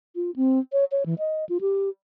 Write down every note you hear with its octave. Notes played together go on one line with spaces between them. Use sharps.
F4
C4
C#5
C#5
E3
D#5
F4
G4